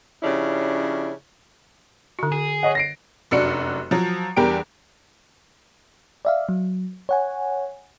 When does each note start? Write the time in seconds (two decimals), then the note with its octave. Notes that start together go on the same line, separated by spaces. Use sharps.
0.23 C#3 F3 C#4 D4 E4 G4
2.19 D3 F#4
2.32 G#4
2.63 C#5 D#5 F#5
2.75 A#6 C7 D7
3.31 F1 F#2 D4 F#4 C#7
3.91 F3 F#3
4.36 E2 G3 D4 A#4 G5 D7
6.25 D5 E5 F5
6.49 F#3
7.09 C#5 F#5 G#5